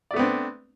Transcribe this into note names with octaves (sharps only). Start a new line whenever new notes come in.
A3 B3 C4 D4 D5